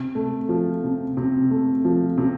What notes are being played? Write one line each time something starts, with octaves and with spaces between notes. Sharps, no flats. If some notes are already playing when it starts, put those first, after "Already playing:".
Already playing: C3
A3
F3
C3
C3
A3
F3
C3